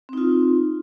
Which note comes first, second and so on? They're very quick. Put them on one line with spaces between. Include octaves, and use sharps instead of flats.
C4 D#4 F4